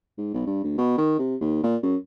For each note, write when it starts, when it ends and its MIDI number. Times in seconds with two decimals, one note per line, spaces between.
0.18 0.31 44
0.34 0.41 35
0.46 0.63 43
0.64 0.74 38
0.78 0.95 47
0.98 1.16 51
1.19 1.36 48
1.41 1.62 39
1.63 1.77 46
1.83 1.96 42